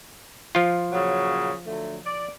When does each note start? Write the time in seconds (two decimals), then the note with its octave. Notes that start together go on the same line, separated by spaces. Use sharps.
0.55 F3 F4
0.92 A#2 C#3 F#3
1.66 D3 F#3 A3
2.05 D5